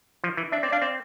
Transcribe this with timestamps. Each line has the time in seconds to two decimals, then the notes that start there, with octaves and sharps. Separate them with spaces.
0.24 F3
0.37 E3
0.52 D4 E5
0.63 C4 D5
0.72 D4 F5
0.82 C4 D5